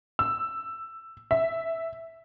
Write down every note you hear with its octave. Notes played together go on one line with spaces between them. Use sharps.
E6
E5